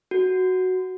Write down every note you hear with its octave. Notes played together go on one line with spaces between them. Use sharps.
F#4